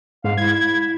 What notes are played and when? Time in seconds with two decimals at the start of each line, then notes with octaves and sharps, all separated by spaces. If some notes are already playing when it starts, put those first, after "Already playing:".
0.24 G#2 F5
0.37 E4 G#6